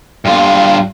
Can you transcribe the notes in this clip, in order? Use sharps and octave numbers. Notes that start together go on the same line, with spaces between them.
G2 F4